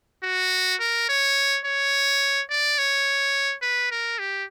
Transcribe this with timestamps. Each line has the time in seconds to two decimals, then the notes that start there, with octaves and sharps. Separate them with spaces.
0.24 F#4
0.80 A#4
1.09 C#5
1.66 C#5
2.50 D5
2.78 C#5
3.62 B4
3.91 A#4
4.19 G4